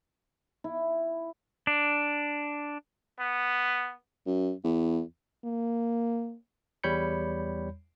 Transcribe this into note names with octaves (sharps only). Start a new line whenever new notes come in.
E4
D4
B3
F#2
E2
A#3
E2 G3 C#5 B5 G6 C#7